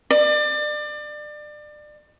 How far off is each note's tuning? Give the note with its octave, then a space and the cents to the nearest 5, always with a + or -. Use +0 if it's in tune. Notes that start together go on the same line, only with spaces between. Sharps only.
D5 +30